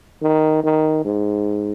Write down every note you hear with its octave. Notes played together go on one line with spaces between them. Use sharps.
D#3
D#3
G#2